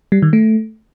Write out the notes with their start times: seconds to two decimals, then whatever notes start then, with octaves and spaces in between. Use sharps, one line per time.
0.12 G3
0.22 D#3
0.33 A3